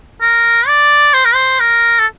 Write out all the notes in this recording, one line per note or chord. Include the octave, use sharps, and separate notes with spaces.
A#4
D5
C5
A#4
C5
A#4
A4